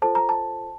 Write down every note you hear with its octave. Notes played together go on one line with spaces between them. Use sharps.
F4 A4 C5 A5
A#5
A5